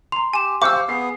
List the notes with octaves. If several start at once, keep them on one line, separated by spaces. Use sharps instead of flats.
A#5 C6 F7
G4 G#5 E7
G4 C5 F5 C#6 D6 E6
B3 G#4 C7